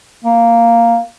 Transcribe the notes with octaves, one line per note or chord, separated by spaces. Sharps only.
A#3